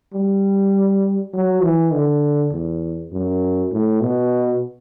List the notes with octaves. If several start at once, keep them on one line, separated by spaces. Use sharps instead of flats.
G3
F#3
E3
D3
E2
F#2
A2
B2